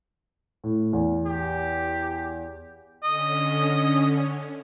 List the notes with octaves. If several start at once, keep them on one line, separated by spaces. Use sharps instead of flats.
A2
E2
G4
D3 C#4 D#5